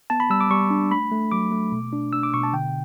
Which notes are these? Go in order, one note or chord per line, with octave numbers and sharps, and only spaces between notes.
B3 A5
B5
G3 E6
D6
G3 C#6
D4
A3 B5
A3
F#3 D6
A3
B2
D4
D4 E6
D6
B2 C#6
A5
D3 G5